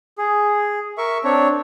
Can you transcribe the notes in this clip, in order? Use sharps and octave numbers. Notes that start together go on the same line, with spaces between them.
G#4
A#4 E5 C#6
C4 D4 C#5